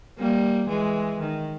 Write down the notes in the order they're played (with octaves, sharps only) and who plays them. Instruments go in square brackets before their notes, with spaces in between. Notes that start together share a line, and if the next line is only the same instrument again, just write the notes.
[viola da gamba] G3 A#3
E3 G#3
D#3